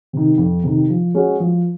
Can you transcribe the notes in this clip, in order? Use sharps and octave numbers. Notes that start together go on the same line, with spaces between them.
C3 D#3
F2
C3 D#3
F3
G#3 C#4 F#4
F3